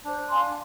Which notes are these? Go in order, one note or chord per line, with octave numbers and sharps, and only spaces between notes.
D4 C5
F5 G#5 C6